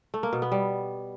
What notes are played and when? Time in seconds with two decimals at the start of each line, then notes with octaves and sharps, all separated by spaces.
0.14 A3
0.23 A#3
0.33 B2
0.42 B3
0.52 G3